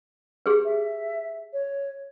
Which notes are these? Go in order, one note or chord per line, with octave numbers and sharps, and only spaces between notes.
G4 G#4 B4
E5
C#5